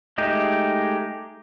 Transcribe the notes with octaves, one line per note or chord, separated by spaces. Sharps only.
G#3 A3 D#4 G4 G#4